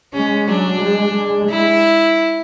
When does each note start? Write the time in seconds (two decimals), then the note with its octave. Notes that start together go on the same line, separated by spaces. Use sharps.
0.13 G#3 C#4
0.48 F#3 D4
0.82 G#3
1.16 G#3
1.50 E4